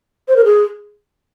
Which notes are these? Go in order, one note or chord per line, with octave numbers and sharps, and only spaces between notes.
C5
A#4
G#4